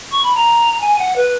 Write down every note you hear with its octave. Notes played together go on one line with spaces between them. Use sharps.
C#6
B5
A#5
G#5
F#5
B4